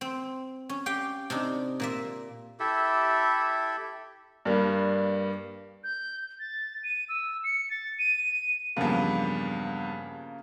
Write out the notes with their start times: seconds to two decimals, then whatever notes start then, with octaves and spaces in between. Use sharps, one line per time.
0.01 C4
0.69 C#4
0.86 G4 F5 G5
1.30 C3 D4 D#4
1.80 A#2 A#3 E5
2.60 E4 G4 A4 E5
4.45 G2 G3 A#3
5.84 G6
6.40 A6
6.84 D#7
7.09 E6
7.44 C#7
7.70 A6
7.99 D#7
8.76 E2 G2 C#3 F3 A#3